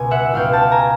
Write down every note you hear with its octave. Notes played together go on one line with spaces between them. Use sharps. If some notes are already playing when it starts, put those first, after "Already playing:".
Already playing: C#2 B2 G#5
E5 F#5
C#2 B2 F5 G5
G5 A5
G#5 A#5